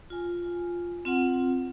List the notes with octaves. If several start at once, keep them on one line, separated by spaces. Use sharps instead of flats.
F4 G#5
C4 F4 F#5